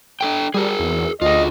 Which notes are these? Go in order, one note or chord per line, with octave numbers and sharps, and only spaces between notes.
D4 A4 G5
G3 G#4 A#4
E2
D2 F4 G#4 D#5